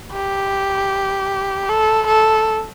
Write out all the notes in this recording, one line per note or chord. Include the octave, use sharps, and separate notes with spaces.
G4
A4
A4